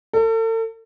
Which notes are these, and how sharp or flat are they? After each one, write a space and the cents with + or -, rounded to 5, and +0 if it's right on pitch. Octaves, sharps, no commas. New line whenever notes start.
A4 +40